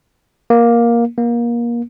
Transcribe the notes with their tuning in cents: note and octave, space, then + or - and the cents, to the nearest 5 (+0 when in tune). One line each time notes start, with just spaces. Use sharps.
A#3 +10
A#3 +25